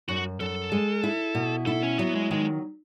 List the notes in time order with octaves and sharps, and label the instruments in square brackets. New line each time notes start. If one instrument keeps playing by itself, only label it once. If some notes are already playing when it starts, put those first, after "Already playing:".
[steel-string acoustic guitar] F#2 [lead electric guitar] F#4
[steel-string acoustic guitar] F#2 [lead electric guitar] A4
[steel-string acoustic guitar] G#3
E4
B2
[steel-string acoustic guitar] E4 [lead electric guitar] A4
[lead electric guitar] C#4
[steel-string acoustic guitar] F#3 [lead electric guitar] B3
[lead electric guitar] G#3
[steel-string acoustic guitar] D#3 [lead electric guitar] G#3